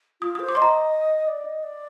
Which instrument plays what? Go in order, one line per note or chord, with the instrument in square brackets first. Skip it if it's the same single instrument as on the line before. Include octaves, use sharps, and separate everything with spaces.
[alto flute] F4 [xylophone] D#6
[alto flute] C5 [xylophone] D#6
[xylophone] D6
[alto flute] D#5 [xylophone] C6
[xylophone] A#5
[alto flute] D5
D#5
D5